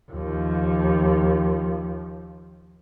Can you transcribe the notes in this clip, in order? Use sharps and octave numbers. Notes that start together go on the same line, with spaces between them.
D#2 F3